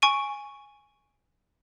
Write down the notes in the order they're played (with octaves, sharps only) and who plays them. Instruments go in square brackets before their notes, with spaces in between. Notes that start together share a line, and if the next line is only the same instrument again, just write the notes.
[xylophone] G#5 C#6 D7 D#7